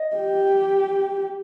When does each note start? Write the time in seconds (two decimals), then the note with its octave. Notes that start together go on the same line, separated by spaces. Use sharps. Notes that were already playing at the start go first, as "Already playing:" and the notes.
Already playing: D#5
0.16 G4